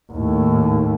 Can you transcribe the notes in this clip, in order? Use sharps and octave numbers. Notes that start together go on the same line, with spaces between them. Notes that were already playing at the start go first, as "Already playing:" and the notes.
D#2 A2